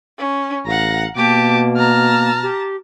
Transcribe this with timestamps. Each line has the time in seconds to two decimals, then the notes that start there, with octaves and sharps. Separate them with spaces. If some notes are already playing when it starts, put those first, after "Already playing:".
0.18 C#4
0.66 A1 F5 F#5 A#5 A#6
1.17 B2 A#3 G4 A5 D6
1.77 A5 A#5 F6
2.42 G4